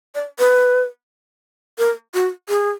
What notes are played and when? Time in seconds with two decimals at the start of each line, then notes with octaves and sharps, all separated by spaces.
0.15 D5
0.39 B4
1.78 A#4
2.14 F#4
2.49 G#4